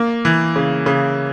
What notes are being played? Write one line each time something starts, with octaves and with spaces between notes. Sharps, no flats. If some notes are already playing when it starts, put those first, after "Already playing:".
Already playing: A#3
E3
C#3
C#3